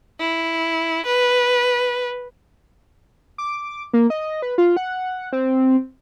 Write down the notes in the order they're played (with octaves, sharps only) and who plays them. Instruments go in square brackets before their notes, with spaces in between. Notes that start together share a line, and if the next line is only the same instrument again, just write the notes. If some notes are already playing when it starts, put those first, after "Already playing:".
[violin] E4
B4
[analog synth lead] D6
A#3
D#5
B4
F4
F#5
C4